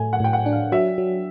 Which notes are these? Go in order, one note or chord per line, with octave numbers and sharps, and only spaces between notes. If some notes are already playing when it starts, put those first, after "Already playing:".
Already playing: A2 A3 G#5
F#5
A2 G5
F#5
D4
F5
F#3 E5
F#3